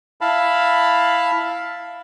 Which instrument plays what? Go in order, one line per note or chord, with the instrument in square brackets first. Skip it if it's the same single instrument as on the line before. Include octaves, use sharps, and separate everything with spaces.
[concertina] E4 F5 A5 B5